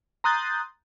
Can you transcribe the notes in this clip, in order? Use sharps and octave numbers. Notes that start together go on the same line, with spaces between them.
A#5 C6 D#6 F#6 G6 A6